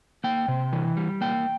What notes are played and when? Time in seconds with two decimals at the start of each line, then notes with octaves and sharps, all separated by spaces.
0.24 A#3 G5
0.48 C3
0.73 E3
0.97 G3
1.21 A#3 G5